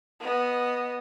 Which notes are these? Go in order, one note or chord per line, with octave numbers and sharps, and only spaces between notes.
B3 D#5